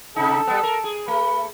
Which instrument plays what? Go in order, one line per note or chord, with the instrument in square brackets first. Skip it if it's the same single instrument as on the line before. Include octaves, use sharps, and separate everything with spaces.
[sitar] C3 D#4 [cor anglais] A4
[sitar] G3 B3
A#4
G#4
[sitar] A3 [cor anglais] B4